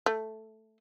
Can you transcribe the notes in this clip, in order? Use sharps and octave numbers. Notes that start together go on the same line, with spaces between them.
A3